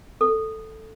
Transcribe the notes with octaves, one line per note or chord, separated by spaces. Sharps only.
A4